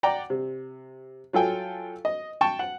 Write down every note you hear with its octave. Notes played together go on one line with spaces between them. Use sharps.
D5 F#5 G5 A#5
C3
F#3 F4 A4 G5 G#5
D#5
G5 A5 C#6
F#5